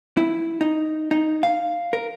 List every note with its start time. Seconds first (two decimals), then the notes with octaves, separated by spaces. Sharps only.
0.17 E4
0.61 D#4
1.11 D#4
1.43 F5
1.93 A#4